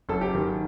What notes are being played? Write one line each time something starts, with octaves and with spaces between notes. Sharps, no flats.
F#1 A4
G4
D#3